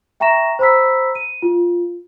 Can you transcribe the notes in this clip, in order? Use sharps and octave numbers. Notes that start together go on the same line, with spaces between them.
E5 G5 A#5 C#6 A#6 E7
C5 A#5 B5 E6 B6
D#7
F4